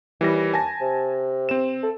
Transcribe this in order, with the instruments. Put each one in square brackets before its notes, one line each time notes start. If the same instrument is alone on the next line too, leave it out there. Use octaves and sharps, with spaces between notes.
[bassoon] D#2 [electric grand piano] E3 G3 A#6
[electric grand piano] G#5 A5 A#6
[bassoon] C3
[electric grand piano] C4 E7
[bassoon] A4